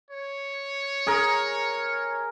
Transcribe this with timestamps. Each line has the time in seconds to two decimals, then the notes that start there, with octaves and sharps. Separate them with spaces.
0.11 C#5
1.07 G#4 A#4